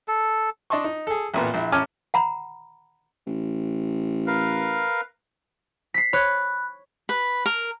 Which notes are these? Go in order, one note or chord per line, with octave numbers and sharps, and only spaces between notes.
A4
D4 D#5 A5 C6 C#6
D#4
G#4 A4
A1 A#2 B3
A#1 E4
A1 C#4 G#5 A5 D6 F6
F#5 A#5 B5
A1
A#4 B4 F5
B6 C7
C#5 B5 F#6
B4
A#4